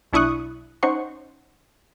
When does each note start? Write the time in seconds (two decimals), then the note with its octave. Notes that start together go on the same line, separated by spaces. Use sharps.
0.13 B1 D4 E4 C#6 D#6 F#6
0.83 C#4 D#4 C5 F#5 C#6